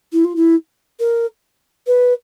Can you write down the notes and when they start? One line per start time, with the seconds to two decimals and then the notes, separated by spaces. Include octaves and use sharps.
0.12 E4
0.24 F4
0.36 E4
0.99 A#4
1.87 B4